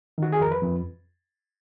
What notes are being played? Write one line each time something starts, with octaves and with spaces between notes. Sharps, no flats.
D#3 F#4
G#4
F2 A#4
B4
F2